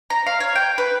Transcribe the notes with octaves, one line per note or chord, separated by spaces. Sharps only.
A#5
F5
C#5
G5
B4